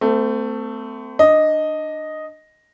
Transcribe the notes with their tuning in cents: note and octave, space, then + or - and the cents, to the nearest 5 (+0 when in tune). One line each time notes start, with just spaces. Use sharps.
A3 +15 C4 -35
D4 +20 D#5 +0